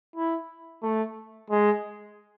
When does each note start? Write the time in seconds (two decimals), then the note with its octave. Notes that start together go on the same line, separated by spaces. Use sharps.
0.16 E4
0.83 A3
1.50 G#3